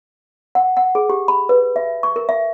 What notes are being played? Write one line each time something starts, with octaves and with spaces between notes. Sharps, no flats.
F#5
F#5
G#4
G4
B5
B4
E5
C#6
A#4
E5